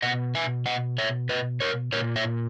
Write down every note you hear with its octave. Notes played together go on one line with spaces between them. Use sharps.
B2 D#5 F#5
E5 G#5
D#5 F#5
C#5 E5
B4 D#5
A#4 C#5
A#2 A#4 C#5
C#5 E5